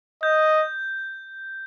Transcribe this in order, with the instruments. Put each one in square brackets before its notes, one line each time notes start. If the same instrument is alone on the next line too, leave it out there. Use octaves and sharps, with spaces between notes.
[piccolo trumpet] D#5 [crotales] G6